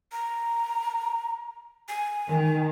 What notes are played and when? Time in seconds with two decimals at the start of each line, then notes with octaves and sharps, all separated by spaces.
0.12 A#5
1.88 G#5
2.28 D#3